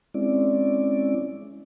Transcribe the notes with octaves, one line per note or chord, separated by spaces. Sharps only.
G#3 C4 C#4 E4 D5